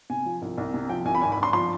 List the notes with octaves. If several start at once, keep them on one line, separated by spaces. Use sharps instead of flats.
C3 G#5
F3
C2
C2
C3
F3 G5
C2 G#5
B5
G#1 G#5
B5
G2
C6
F3 C6